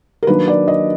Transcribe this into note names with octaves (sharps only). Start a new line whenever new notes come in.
A#4
D#3 F#3 A#3 D4 B4
D5
D#5